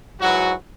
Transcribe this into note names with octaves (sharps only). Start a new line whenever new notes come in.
G#2 E3 F#3 F#4